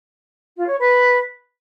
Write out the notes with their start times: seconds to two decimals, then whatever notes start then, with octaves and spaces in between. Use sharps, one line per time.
0.55 F4
0.67 C#5
0.79 B4